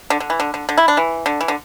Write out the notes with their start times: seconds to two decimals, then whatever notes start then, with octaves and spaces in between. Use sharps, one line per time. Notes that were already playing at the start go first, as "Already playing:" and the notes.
0.10 D3
0.20 D3
0.30 E3
0.40 D3
0.54 D3
0.69 D3
0.77 E4
0.88 D4
0.97 E3
1.26 D3
1.41 E3
1.48 D3